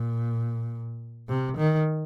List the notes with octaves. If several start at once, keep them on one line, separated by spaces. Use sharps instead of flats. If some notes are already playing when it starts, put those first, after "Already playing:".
Already playing: A#2
C3
D#3